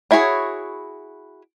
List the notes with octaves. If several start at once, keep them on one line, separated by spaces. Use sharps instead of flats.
D4 E4 F#4 G#4 C#5